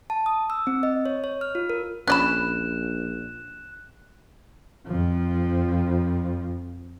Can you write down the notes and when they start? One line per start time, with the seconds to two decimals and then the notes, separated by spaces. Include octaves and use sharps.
0.10 A5
0.26 D#6
0.50 E6
0.67 C4
0.83 D#5
1.06 C#5
1.24 C#5
1.41 F6
1.55 F4
1.70 A#4
2.08 A#1 C#4 D5 B5 F#6 E7
4.86 F2 F3